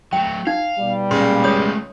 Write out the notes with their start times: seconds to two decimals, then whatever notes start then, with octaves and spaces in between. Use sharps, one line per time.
0.13 F#3 A3 G5
0.47 D#4 F5
0.79 B2 G3
1.11 C#2 A#2 C#3 C6
1.44 G#3 A3 C#5 D#6